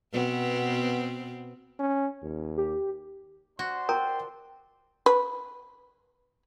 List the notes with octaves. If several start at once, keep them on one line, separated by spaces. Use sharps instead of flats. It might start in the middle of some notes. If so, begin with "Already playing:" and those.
B2 B3 C4
C#4
D#2
G4
D4 F#4 C5 C6
A#4 G5
B4